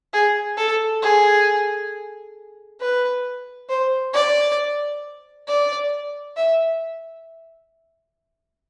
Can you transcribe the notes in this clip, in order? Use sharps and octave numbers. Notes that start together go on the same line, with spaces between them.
G#4
A4
G#4
B4
C5
D5
D5
E5